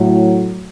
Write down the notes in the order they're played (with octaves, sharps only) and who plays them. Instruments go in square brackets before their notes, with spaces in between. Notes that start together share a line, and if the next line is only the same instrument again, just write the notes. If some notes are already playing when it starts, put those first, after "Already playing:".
Already playing: [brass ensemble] A2 F#3